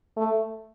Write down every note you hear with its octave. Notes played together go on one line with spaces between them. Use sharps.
A3